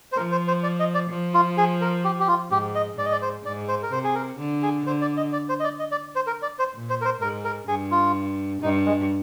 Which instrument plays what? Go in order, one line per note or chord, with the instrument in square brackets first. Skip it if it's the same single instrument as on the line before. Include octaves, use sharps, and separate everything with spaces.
[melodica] C5
[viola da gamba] F3 [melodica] A#4
[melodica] C5
C5
D5
D#5
D5
[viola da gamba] F3
[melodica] F4
G#4
A#4
G4
G4
F4
[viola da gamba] G#2 [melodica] G4
[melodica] D#5
[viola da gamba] G#2 [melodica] D5
[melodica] D#5
D5
C5
[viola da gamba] G#2 [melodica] D5
[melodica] C5
A#4
[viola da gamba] C3 [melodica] C5
[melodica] G#4
A#4
[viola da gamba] D3
[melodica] G#4
[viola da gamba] D3 [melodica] C5
[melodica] D5
D#5
D5
C5
D#5
D5
D#5
D5
C5
A#4
D5
C5
[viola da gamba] A#2
[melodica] C5
A#4
C5
[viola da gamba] G#2 [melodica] A#4
[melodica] A#4
[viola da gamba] G2 [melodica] G#4
[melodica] F4
[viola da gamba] G2 [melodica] D#4
[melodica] G#3